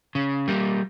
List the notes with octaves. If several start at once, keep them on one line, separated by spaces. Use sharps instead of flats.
C#3
G3 A#3